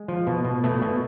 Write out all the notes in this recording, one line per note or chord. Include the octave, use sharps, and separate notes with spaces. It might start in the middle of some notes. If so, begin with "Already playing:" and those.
Already playing: G#3
F3
B2
B2
B2 A3
B2